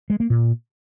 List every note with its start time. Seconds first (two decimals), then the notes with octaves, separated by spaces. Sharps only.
0.10 G#3
0.20 A#3
0.30 A#2